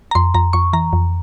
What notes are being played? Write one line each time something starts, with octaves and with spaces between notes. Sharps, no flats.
A#5
F2 C6
F2 A#5
F2 C#6
E3 A#5
F2